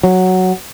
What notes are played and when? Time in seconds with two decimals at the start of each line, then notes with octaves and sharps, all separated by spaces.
0.03 F#3